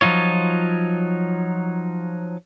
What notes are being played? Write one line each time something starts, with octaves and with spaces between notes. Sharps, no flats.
F3 F#3 D#4 F4 C#5